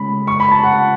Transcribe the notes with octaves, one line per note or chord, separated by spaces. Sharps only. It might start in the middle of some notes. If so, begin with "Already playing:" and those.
Already playing: C#3 G#3 C#4 B5
C#6
B5
A5
F#5